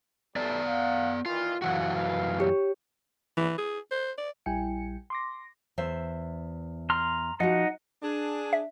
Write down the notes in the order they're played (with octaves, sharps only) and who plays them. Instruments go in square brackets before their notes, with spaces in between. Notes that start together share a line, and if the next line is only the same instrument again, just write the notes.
[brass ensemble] B1 G3 A3 [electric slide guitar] B3 D5
[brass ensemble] F5 F#5
[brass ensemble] A#2 D#3 E3 [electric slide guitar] F4
[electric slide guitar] F#2 E3 F#4 [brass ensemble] F5 F#5
[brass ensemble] B4 F5
[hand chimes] G4 C#5
[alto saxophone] E3
G#4
C5
D5
[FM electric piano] A#1 G3 E4 G5 G#5 C#7
C6 D6 A#6
[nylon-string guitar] E2 C5 E5
[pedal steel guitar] A#5 C6 F6
[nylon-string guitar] F3 F#4 [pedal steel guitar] D#4 D#5 F#5
[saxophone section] D4 G#4
[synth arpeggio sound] E5